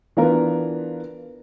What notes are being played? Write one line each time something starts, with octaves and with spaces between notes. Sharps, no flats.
E3 B3 D4 F4 A#4 B4